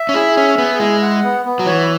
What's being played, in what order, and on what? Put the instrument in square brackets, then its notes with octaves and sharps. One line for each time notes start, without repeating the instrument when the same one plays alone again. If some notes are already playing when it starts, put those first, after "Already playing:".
Already playing: [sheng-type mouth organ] E5
[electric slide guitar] C#4
[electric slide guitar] E4 [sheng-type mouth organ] G#4
[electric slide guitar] C#4 [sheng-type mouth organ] E5
[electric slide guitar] B3 [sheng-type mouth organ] G#4
[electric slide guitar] G#3 [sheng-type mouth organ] E4
[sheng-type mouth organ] F#5
B3
B3
[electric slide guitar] F#3
[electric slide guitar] E3 [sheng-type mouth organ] C#5